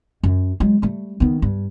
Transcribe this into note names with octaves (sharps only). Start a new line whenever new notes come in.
F#2
F#3 G#3
G3 A3
D#3 B3
G2